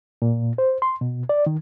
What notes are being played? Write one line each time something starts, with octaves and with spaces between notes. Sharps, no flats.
A#2
C5
C6
B2
D5
D#3